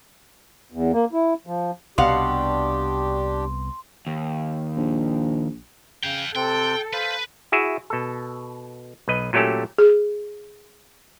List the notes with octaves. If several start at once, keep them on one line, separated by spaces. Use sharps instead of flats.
E2
A#3
E4
F3
C2 B2 B3 D4 G4 F5 F#5 C6
D#2
A#1
C#3 F5 G5
C3 C4 A4 G5 F#6
B4 C5 F5
E4 F#4 G#4 E5
B2 A4
B1 B4 D#5
A#2 F#3 A3 C#4 G4 A4
G#4